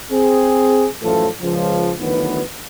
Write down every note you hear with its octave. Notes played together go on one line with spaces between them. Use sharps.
C4 G#4
F#2 A2 E3 F3 A4
C#2 F3
D2 D#3 E3 F#3 B3 B4